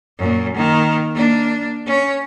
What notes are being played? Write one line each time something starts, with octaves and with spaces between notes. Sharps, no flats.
F#2 A#2
D#3 A#3
A#3 D4
C#4 C#5